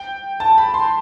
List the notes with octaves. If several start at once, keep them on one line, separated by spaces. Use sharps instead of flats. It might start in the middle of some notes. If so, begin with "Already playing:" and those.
Already playing: G5
A5
B5
C6